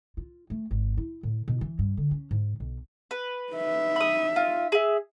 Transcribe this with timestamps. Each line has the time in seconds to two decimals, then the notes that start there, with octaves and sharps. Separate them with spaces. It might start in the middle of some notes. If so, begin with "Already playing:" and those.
0.17 F4
0.50 A3
0.71 G#1
0.97 E4
1.23 A2
1.48 B2
1.61 E3
1.79 G2
1.97 D3
2.11 C#4
2.31 G#2
2.60 B1
3.11 B4
3.53 D#4 E5
3.96 B5 D#6
4.36 F4
4.72 G#4 E5